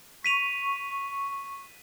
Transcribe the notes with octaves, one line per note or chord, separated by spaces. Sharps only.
C#6 B6 D#7 F7